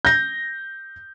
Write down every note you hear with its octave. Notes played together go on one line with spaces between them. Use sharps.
G6 A#6